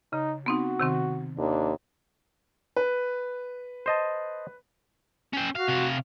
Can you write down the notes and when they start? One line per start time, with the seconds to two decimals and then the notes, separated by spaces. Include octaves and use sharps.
0.13 C#3 D#4
0.46 B3 C4 D#4 F#4
0.80 C3 D#3 C4
1.38 D#2 D4
2.76 B4
3.86 C5 D#5 A5
5.34 C#4 G5
5.56 F#4 F5
5.69 C3 F5